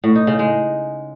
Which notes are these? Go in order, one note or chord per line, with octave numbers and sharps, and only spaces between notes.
A2
D#4
C#3
G#3